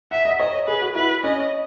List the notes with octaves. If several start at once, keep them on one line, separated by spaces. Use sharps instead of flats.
E5 F#5
D#5
C#5 D#5
G#4 B4
F#4
E4 B4
C#4 D#5